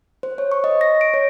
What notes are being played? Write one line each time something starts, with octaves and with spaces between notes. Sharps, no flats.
C5
C#5
C#6
D#5
A#6
D7
C#5